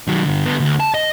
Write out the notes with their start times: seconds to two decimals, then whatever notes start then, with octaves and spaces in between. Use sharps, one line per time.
0.08 D#3 F#3
0.24 G2 D3
0.45 D3 B3
0.60 D2
0.80 A5
0.94 D#5